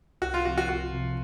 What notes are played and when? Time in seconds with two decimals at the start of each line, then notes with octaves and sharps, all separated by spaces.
0.22 C2 F#4
0.34 F4
0.45 C3 F3 C4 F#4
0.58 F#4
0.69 C2 F#4
0.93 C3 F3 C4